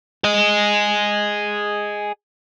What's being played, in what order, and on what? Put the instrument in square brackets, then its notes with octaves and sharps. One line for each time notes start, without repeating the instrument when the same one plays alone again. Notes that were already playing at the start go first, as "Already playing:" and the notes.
[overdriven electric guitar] G#4 D#5